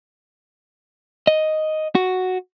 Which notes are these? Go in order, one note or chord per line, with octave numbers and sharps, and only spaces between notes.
D#5
F#4